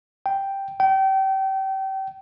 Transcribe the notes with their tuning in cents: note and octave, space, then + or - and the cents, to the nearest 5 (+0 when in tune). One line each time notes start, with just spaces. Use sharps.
G5 +0
G5 -30